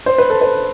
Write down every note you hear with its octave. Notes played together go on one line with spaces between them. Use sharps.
C5
B4
A4
B4